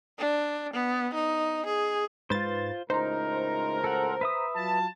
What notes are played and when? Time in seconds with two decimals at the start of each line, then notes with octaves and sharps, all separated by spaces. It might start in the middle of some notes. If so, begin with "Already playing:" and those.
0.19 D4
0.73 B3
1.14 D#4
1.66 G#4
2.30 G#2 F4 B4 C5 A6
2.90 C#2 A2 D#4 A#4 C5 A#5
3.84 A4 F#5
4.21 B4 E5 D#6
4.56 F#3 F4 A5